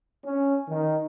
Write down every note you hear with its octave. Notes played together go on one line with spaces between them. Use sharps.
C#4
D#3